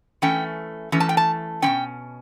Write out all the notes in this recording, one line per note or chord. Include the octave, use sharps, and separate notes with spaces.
E3 A3 C#4 G5
E3 A3 C#4
A5
G5
A5
B2 G3 C#4 G5